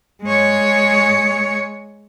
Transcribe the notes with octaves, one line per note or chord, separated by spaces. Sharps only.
G#3 C#5